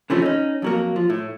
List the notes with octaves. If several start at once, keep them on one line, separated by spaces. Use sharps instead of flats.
C#3 E3 F3 A3 C4 C#4
C#4 D#4
F2 F#3 A#3
F3
A2